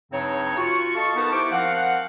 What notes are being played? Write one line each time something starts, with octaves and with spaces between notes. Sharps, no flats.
G2 C#3 F#3 C4 D#4 C#5
F4 F#4 C#6
A4 D#5 F5 A5 C#6
B3 D#4 A#4 B4 A5
E4 G4 C5 C#6 D6
F3 C4 A#4 F5 F#5